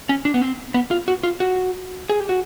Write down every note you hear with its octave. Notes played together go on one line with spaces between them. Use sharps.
C#4
D4
B3
C4
B3
F4
F#4
F4
F#4
G#4
G4
F#4